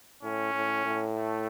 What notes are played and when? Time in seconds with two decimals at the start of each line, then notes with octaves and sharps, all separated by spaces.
0.23 A2 C#4
0.54 A2
0.85 A2
1.16 A3